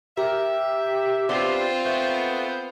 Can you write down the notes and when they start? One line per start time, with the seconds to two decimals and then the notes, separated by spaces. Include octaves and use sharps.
0.17 G4 A#4 E5
1.29 B3 C4 D4 F4 G4 C6
1.85 A3 B3 G6